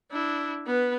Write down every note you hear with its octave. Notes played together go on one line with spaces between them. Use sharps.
D4 E4
B3 B4